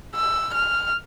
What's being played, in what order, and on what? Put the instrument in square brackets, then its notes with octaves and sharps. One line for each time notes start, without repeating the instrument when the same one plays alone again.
[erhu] E6
F6